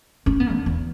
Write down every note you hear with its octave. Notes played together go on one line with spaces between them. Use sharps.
C#4
B3
D3
E2